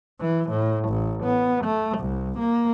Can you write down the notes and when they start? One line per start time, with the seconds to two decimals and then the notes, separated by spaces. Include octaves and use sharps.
0.20 E3
0.50 A2
0.89 A1
1.23 B3
1.65 A3
1.98 C2
2.39 A#3